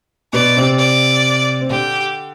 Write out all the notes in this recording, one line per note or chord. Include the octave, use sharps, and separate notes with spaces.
B2 B3 D5
C3 C4
D5
C4
D3 D4 G4